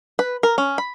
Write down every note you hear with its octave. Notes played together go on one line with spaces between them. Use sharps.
B4
A#4
C#4
B5